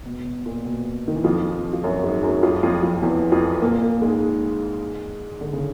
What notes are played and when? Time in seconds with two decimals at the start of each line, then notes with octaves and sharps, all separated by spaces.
0.06 B2
0.25 B2
0.46 A#2
0.65 B2
1.08 D#3
1.16 E3
1.24 F2 F3
1.73 F3
1.84 F#2 F#3
2.03 G#2 G#3
2.23 F#2 F#3
2.43 F2 F3
2.63 F2 F3
2.83 F2 F3
3.02 E2 E3
3.32 F2 F3
3.62 A#2 A#3
3.82 A#2 A#3
4.01 G#2 G#3
5.41 D3
5.53 C#3